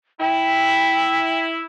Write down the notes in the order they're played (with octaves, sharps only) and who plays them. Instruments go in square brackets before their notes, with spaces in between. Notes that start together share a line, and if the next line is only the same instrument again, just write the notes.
[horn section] E4 [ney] G5